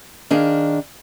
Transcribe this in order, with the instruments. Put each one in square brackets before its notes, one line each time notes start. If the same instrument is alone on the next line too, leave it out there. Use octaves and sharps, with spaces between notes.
[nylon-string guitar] D#3 D4 G#4 F5